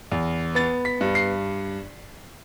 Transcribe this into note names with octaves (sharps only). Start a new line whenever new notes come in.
E2
B3 A6
B6
G2
C7